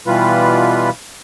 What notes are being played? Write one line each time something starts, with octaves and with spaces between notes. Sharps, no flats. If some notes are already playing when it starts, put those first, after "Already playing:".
B2 E3 G3 F4 B4